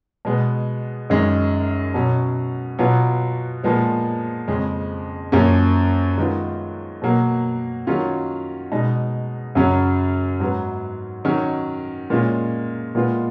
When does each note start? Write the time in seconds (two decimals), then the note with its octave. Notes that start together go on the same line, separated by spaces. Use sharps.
0.25 B2 G#3 B3
1.10 F#2 D#3 G#3 C#4
1.94 B2 F#3 C#4
2.79 B2 F#3 B3 F4
3.63 A#2 F3 G#3 B3
4.48 F2 C#3 G#3 C#4
5.32 F#2 F3 A#3 C#4
6.18 D#3 G#3 B3 F4
7.02 B2 F#3 A#3
7.87 D#3 F#3 C#4 F4
8.72 B2 G#3 D#4
9.55 F#2 C#3 F#3 C#4
10.40 G#2 F#3 B3
11.25 D#3 F#3 C#4
12.10 A#2 G#3 C#4 F4
12.95 A#2 G#3 B3 F4